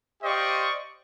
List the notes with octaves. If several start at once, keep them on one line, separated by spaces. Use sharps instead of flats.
G4 C5 D5 D#5 F5 C#6